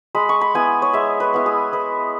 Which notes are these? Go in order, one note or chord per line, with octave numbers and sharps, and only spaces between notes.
G#3 B5
C#6
B5
B3 E4 G#5
C#5
G#3 E5
B4
B3 E4
G#4
G#3 B4